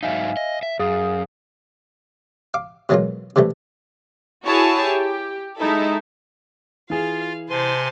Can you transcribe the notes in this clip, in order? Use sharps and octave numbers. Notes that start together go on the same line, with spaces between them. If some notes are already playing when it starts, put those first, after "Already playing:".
G#2 F#3 D#4 E5 F5 G#5
D#5
E5
F#2 G#4 F5 D#6
F5 D6
B2 E3 F#3 G#3 A#3 F4
C3 E3 G3 A3
E4 F#4 G#4 C#5 A5
G4
G#3 D#4 E4 A4
E3 F4 G#4 F5
C3 C5 G#5 A5 C6